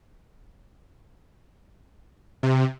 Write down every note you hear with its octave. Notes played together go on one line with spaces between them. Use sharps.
C3